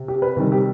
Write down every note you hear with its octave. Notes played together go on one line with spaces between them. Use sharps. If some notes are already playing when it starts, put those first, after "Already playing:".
Already playing: C3
G4
B4
C3 D#3 G3 G4
G4